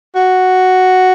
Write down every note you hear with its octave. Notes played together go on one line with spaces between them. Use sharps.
F#4